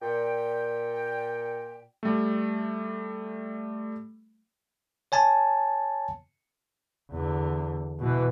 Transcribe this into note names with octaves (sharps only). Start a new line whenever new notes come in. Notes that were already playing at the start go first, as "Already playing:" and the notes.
A#2 G5
G3 A3
C#5 G#5 A5
E2 D3
B2 E3